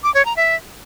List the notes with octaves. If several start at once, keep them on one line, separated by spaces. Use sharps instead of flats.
D6
C#5
A#5
E5